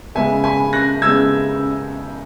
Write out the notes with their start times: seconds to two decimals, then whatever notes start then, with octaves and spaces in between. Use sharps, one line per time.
0.15 C#3 G#3 B3 E5 G#5
0.44 G#5 B5
0.73 F#6 A#6
1.02 C#3 G#3 B3 E6 G#6